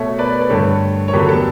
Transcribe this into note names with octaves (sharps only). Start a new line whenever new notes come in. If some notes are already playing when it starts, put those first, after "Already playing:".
Already playing: B2 A3 C#5 E5
B4 D5
B4
G2 D3 A3 A4 C#5
C#5
E2 D3 F#3 A3 G4 B4
A4